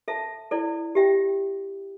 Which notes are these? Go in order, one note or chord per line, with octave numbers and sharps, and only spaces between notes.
A4 E5 A5
E4 A4 D5
G4 E5 G5